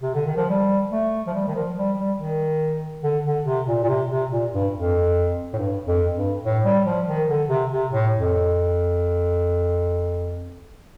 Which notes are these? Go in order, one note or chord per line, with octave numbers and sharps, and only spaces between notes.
C3
D3
D#3
F3
G3
A3
F3
G3
D#3
F3
G3
G3
D#3
D3
D3
C3
A#2
A#2
C3
C3
A#2
G2
F2
A2
G2
F2
G2
A2
G3
F3
D#3
D3
C3
C3
A2
F2